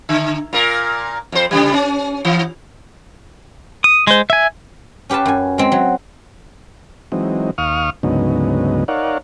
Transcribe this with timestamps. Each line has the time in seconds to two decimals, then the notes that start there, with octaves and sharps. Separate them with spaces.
0.09 D3
0.53 A#2 A#4
1.32 F2 C5
1.51 C#3 E3 G3
1.74 C#4
2.25 E3
3.84 D#6
4.07 G#3 C5
4.30 E5 G#5
5.10 C#4 G4 B4 F5 A5
5.26 F#2 G#5
5.58 G#3 C4
5.72 F#3
7.12 E3 F#3 G#3 C4 D#4
7.58 D#2 F5 C#6 D#6 F6
8.03 D2 G#2 C#3 F#3 B3 D#4
8.88 D#4 A#4 C#5 D5 F5 F#5